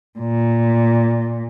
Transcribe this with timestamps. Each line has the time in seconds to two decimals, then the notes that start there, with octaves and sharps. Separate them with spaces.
0.20 A#2